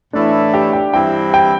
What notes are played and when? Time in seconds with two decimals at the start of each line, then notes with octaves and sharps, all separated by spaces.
0.13 A2 E3 A3 D4 E4
0.54 G4
0.73 G5
0.94 G2 E3 C4 E4 G5
1.34 G5